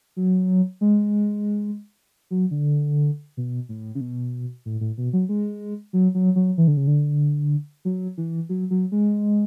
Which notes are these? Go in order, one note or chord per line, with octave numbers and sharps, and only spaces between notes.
F#3
G#3
F#3
D3
B2
A2
C#3
B2
A2
A2
B2
F#3
G#3
F#3
F#3
F#3
E3
D3
C#3
D3
F#3
E3
F#3
F#3
G#3